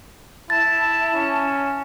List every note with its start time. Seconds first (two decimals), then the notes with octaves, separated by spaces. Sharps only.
0.50 E4 A5 A6
1.14 C#4